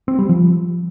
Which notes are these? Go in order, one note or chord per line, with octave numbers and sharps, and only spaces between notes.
C4
G3
F3